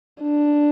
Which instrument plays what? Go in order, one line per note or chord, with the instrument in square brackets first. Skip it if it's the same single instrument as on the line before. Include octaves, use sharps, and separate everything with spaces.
[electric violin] D4